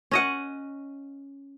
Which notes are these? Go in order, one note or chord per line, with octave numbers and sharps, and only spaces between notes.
C#4 D#5 F#5